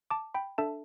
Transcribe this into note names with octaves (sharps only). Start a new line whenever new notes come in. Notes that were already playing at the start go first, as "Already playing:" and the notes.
A5 D6
G5 B5
D4 A4 E5 A5